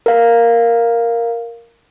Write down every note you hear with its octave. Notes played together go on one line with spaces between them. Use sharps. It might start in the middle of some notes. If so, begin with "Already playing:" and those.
A#4 F5